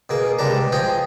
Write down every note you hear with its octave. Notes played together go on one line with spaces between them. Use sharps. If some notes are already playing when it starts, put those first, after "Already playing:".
B2 A#3 G#4
C2 G3 G#3 D4 A5 A#5
B2
F3 D#5 G5 G#5